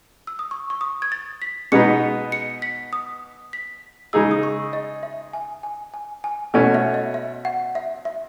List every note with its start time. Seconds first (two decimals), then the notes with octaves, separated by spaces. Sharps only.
0.27 E6
0.39 D#6
0.51 C#6
0.70 C#6
0.81 D#6
1.02 G#6
1.12 A6
1.42 B6
1.72 B2 G#3 B3 D#4 C#7
2.32 C#7
2.62 B6
2.93 D#6
3.53 B6
4.13 C#3 G#3 D#4 G#4 E6
4.31 D#6
4.43 C#6
4.73 D#5
5.03 E5
5.33 G#5
5.63 G#5
5.94 G#5
6.24 G#5
6.54 B2 A3 C#4 F#4 G#5
6.74 E5
6.94 D#5
7.14 E5
7.45 F#5
7.75 E5
8.05 E5